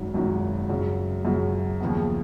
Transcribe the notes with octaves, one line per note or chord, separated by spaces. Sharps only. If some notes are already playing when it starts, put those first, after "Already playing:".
Already playing: G#1 F#2 D#3 F#3
G#1 F#2 D#3 F#3
F#2 C#3 F#3
F#2 C#3 F#3
D#2 C#3 F3 B3